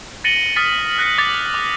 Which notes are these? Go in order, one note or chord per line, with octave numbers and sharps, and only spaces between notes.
A6 A#6 C#7 D#7 F#7 G7
D#6 F6 A6 B6 D#7
F6 F#6 A#6 C#7
D6 G#6 A6 B6
D6